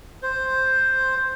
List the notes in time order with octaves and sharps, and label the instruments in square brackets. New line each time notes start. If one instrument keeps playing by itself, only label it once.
[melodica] C5